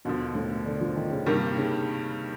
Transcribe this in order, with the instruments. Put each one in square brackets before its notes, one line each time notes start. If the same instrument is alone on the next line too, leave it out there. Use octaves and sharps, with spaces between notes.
[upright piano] D#2 D3 F3 [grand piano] B2
[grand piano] A2
D3
F3
D#3
C#3
[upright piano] G2 D#3 G3 A#3 [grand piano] C3
[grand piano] C#3